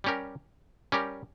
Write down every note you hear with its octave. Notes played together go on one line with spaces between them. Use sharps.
G3 C#4 G4 A#4
G3 C#4 G4 A#4